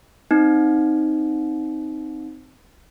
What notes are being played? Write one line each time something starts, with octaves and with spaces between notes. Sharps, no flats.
C4 D#4